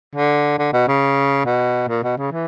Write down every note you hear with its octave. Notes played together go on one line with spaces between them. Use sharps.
D3
D3
B2
C#3
B2
A#2
B2
C#3
E3